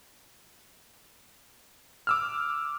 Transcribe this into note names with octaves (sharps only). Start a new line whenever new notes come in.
D6 E6 F6